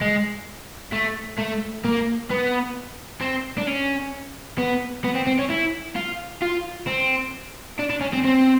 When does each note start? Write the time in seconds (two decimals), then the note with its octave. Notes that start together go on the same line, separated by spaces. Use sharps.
0.01 G#3
0.92 A3
1.38 A3
1.85 A#3
2.30 B3
3.21 C4
3.58 D4
3.67 C#4
4.58 B3
5.04 B3
5.15 C4
5.27 C4
5.39 C#4
5.50 E4
5.96 F4
6.42 F4
6.88 C4
7.79 D4
7.90 D4
8.01 C#4
8.13 C4
8.25 C4